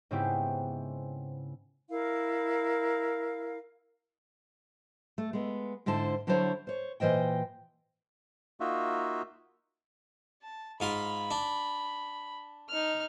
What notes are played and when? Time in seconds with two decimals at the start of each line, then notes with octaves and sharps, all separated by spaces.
0.11 G#2 C#3 B3 C4 E4 G4
1.89 E4 A#4 F5
5.18 A3
5.33 G#3 B3
5.86 G#2 D3 E4 C5 A5
6.27 D3 F#3 D4 E4 C5 C#5
6.67 C5 C#5
7.00 A#2 E3 C5 D#5 G5
8.60 A#3 D#4 F4 F#4 E5
10.42 A5
10.80 G#2 F4 B5 C6
11.31 D4
12.69 D#4 F6